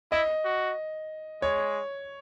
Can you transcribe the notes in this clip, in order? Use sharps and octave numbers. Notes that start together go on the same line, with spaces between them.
E4 D#5
F#4
G#3 C#5